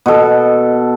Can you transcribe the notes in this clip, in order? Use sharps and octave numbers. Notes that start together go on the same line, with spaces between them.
B2 A4